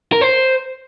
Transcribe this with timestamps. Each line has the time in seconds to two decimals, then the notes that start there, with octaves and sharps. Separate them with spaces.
0.13 A#4
0.21 C5